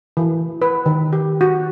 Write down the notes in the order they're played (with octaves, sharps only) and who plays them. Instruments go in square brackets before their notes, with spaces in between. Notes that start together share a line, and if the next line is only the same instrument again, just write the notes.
[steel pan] E3
B4
D#3
G4
F#4